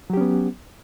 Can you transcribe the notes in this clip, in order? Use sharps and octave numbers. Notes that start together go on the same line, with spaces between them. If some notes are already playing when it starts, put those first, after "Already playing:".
F#3 B3 C#4 G4